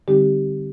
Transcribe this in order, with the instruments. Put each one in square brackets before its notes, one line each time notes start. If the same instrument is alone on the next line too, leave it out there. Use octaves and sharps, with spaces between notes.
[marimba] D3 G3 C4 D#4 G4